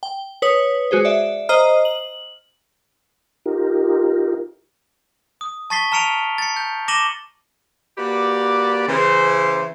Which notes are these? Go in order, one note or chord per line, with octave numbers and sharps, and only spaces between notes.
G5
B4 C#5 D#6
G#3 F#4 G#4 C5
D5 E5
C5 D#5 A#5 D#6 F6
F#7
D#4 F4 G4 A#4
D#6
A5 C#6 A6 B6 C7 G7
A5 A#5 F6 C#7 D7 F7
A6 C#7
G6
D6 A#6 D#7 E7 F#7 G7
A#3 F#4 G4 B4 D5
C#3 E3 C5